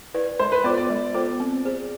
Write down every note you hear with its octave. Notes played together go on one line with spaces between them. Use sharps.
E4 B4 D5
G#3 C5
B4
B3 F4 A4 C5 D5
D5
G#3
B3 F4 A4 C5
C4
G#4 C5